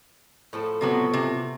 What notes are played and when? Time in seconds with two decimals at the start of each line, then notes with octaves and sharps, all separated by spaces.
0.53 A2 F3 A4
0.81 C3 F#3 B3
1.13 C3